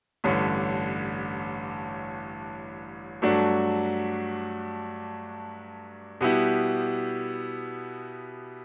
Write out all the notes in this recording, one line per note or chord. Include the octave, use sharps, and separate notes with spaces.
A1 G2 D3 A3 C#4
G2 F#3 A3 D4 F#4
B2 G3 B3 E4 G4